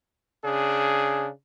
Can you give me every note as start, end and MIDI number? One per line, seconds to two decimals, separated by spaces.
0.45 1.28 49
0.45 1.28 62
0.45 1.28 68